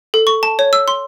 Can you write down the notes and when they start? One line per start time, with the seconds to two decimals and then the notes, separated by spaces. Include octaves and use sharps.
0.14 A4
0.27 C#6
0.43 A5
0.59 C#5
0.73 E6
0.88 C6